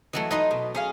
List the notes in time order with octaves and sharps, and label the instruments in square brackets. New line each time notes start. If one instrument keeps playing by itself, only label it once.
[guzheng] E3 F#3 A3 [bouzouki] D#5
[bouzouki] D#4 [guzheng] B4 D#5 C6
[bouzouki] B2
C#4 G#4 F5